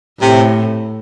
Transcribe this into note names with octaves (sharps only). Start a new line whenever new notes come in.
A2 C3